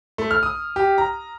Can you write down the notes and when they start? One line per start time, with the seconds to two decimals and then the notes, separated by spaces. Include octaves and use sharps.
0.18 A3
0.31 F6
0.43 D#6
0.76 G4
0.98 A#5